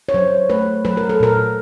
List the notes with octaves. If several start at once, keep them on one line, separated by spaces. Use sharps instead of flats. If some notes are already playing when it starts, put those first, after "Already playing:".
C#5
F#3 C5
A3 B4
F#3 B4
A#4
A4
A#2 A#4